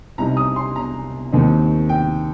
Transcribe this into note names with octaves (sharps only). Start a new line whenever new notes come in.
C2 C3 G3 D#4 A#5
D#6
C6
A#5
D#2 D#3 C4 D#4
G5